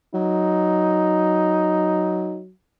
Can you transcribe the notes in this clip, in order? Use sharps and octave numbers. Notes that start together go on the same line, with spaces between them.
F#3 D#4